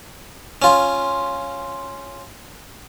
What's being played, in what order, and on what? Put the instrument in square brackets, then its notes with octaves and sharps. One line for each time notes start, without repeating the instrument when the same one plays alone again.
[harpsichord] C#4 F4